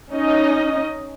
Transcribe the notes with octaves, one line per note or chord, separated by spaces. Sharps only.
C#4 D#4 D#5